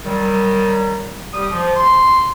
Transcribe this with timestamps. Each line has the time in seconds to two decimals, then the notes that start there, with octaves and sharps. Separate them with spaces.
0.04 D#3 F#3 G3
1.33 G3 G4 D#6
1.51 F3
1.76 C6